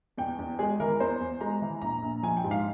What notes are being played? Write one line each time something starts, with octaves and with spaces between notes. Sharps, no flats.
E2 G5
E2
G#3 G#4
E3 A#4
E2 C5
E2
G#3 A#5
E3
A#1 A#5
A#1
F3 G#5
G5
G#2
F5